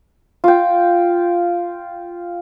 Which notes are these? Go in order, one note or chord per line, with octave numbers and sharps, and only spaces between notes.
F4 G5